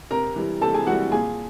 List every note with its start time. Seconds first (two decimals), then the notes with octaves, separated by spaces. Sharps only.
0.11 C3 A#4 A#5
0.36 E3 G3
0.61 C3 A4 A5
0.74 G#4 G#5
0.87 E3 F#4 F#5
0.91 G3
1.12 A#2 G#4 G#5